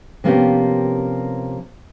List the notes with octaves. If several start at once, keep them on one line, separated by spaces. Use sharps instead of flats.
C3 F3 A#3 B3 C#4 G4